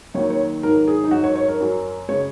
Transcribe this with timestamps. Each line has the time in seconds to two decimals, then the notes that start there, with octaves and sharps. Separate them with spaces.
0.14 D#2 D#3 F#3 C#5
0.30 C#5
0.63 G#2 D#3 F#3 A#4
0.88 G#4
1.04 D#4
1.11 G#2 F#3 F#4
1.24 C#5
1.36 C#5
1.48 A#4
1.60 F#2 F#3
2.09 C#3 G#3 C#5